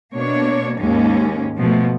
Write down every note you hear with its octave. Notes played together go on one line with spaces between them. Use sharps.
B2 A#3 D4 C#5
D#2 G#2 G#3 C#4
B2 F3 A3